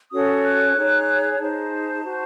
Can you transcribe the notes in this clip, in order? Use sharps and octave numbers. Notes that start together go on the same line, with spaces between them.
C#4 F#4 A4 C#5 D#6
F#6
D#4 G#4 C#5
D#4 G#4 C5 A5
F#4 C5